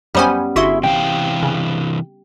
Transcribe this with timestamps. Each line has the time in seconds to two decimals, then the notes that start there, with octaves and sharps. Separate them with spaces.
0.15 F#2 G3 B3 C#4 C5 G#5
0.56 G1 E4 F#4 G#4 E5 C6
0.83 C3 E3 F5 G5
1.43 C#3